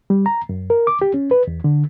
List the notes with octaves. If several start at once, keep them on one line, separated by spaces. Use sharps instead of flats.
G3
A#5
F#2
A#4
D6
G4
C#4
B4
E2
D3